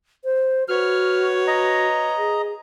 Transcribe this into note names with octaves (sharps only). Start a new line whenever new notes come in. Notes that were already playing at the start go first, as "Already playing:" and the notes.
C5
F#4 B4 C#5 F6
D#5 A#5
G#4